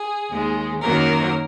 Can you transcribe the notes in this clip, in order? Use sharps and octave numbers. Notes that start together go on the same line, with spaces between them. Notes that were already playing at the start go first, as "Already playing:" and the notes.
Already playing: G#4
D#2 D#3 G#3
F#2 D#3 F#3 A#3 A#4